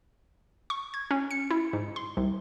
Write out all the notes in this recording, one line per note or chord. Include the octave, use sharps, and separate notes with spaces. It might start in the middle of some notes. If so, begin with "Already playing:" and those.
C#6
G#6
C#4
C#7
E4
G#2
C6
C2